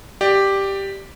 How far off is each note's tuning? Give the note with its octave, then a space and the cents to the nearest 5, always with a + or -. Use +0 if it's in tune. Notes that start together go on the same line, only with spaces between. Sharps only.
G4 +0 D5 +15